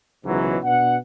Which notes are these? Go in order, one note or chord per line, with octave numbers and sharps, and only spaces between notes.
C#2 G#2 B2 E3 F#3
B2 D4 B4 F#5